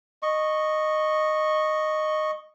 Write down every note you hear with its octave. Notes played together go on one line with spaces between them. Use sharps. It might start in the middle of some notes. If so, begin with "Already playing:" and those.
D#5 C#6